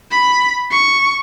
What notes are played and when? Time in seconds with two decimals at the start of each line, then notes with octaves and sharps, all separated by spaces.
0.11 B5
0.71 C#6